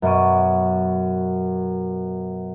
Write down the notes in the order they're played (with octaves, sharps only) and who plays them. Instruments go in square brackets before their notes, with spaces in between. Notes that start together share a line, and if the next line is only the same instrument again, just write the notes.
[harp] F#2 B2 C#6 D6 D#7